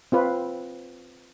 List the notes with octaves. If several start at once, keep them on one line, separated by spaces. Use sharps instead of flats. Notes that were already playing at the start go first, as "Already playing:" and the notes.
C4 F4 B4